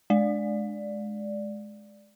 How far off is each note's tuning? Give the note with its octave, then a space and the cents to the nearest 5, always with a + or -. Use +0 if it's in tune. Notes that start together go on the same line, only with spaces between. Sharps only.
G#3 +20 D5 +0